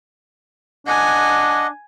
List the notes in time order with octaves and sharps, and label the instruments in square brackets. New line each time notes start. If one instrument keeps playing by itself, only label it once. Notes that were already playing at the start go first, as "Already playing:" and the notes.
[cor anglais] D4 [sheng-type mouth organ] D#5 F#5 [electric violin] G#5